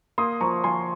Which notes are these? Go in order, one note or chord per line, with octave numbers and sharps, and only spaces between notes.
A#3 C6 D#6
F3 A#5 C#6
F3 G#5 C6